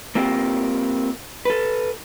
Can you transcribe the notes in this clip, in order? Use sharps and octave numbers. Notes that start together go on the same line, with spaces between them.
A#3 C4 F4 G4 A#4
A4 B4